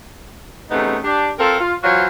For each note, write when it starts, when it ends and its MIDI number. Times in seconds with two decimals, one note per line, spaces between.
0.70 0.97 40
0.70 0.97 48
0.70 0.97 57
0.70 0.97 59
0.70 0.97 61
0.70 0.97 63
1.03 1.29 62
1.03 1.29 67
1.39 1.56 60
1.39 1.56 65
1.39 1.56 69
1.39 1.56 70
1.59 1.75 65
1.83 2.08 52
1.83 2.08 54
1.83 2.08 65
1.83 2.08 66
1.83 2.08 72
1.83 2.08 73